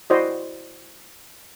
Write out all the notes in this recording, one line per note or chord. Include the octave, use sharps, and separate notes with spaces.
E4 F#4 C5 D5 D#5